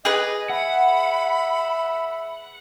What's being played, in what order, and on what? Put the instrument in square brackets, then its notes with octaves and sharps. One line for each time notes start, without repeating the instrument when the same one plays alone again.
[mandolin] G#4 B4 [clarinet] D#5
[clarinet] E5 [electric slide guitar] F#5 [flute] B5